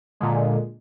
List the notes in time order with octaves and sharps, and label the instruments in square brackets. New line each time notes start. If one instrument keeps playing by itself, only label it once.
[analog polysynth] A#2 D3 G#3